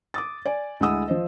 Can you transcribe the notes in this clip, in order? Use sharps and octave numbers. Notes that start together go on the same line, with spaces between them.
D6 D#6 A6
D5 G#5
D2 G#3 E4 F#5 D#6 E6
F3 C5 D#5